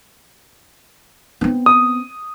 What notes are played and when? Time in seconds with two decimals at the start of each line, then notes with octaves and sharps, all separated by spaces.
1.41 B3 C4
1.66 D#6